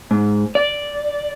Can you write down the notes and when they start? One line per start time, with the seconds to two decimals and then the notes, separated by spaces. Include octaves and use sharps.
0.11 G#2
0.55 D5